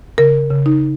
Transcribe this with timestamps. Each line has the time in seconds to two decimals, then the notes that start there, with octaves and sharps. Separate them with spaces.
0.18 C#3 A#4
0.50 C#3
0.66 D#4